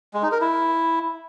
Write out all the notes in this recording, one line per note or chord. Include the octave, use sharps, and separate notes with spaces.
G#3
D#4
A#4
E4